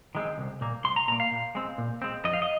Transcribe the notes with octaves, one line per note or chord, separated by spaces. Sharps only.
D#3 G#3 C4
C2
A#2 A#3
C2 C6
A#5
A#2 A#3 A#5
F5
A#2
G#3 C4
A#2
G#3 C4
F2 D#5
F5
D#5